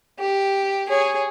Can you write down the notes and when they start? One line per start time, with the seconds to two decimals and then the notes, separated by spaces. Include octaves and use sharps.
0.19 G4
0.89 G#4 C#5